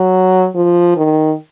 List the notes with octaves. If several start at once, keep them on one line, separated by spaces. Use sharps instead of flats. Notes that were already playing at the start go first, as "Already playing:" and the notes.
Already playing: F#3
F3
D#3